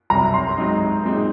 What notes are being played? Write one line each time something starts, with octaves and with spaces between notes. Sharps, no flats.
C2 C3 F#3 A#5
C6
G#2 F#3 C4 D#4
A#2 G#3 C4 D#4